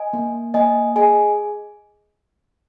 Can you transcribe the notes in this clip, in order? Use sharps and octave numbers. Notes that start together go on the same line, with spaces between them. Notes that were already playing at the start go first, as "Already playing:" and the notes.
Already playing: D#5 G#5
A#3
A#3 D#5 G#5
G#4 D#5 G#5